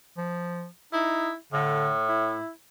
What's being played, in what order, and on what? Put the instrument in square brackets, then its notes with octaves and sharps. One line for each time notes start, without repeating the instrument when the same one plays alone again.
[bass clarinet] F3
[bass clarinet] D#4 [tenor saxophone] E4
[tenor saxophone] A2 [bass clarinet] D3
[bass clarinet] E4